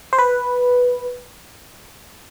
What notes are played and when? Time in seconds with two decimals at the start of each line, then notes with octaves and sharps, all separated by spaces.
0.13 C5
0.18 B4